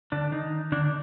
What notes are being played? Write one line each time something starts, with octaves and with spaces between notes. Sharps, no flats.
D3 D4
D#3 D#4
D3 D4